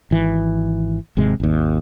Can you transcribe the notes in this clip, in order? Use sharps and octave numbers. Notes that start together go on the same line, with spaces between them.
G#1 E3
G#1 C3 G#3
G#1 D#2